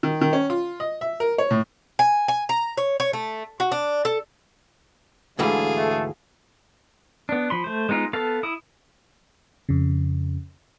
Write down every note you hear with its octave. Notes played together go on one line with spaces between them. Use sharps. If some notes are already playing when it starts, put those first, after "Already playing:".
D#3
D#3
C#4
F4
D#5
E5
A#4
C#5
A2
G#5
G#5
A#5
C#5
C#5
A3
F#4
D4
A4
D2 G#2 E3 D4 G#4 A4 F5
A3
B3 D4
F3 B5 C6
A3 C5
G#3 B3 D#4 F4
B3 A4 F5 A5
E4 D#6
F2 C#3